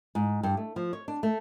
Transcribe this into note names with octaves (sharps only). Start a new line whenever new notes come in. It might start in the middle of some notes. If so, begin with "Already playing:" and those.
G#2
G2
A3
F3
C#5
D4
A3